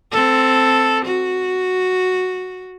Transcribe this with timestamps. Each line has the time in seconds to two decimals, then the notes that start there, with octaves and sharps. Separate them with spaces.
0.12 C4 A4
1.05 F#4